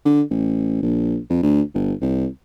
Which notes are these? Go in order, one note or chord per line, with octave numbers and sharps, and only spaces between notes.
D3
A1
A#1
F2
D2
G1
C2